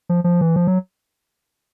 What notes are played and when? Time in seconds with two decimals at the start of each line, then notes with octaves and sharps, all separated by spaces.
0.09 F3
0.24 F3
0.41 E3
0.56 F3
0.67 F#3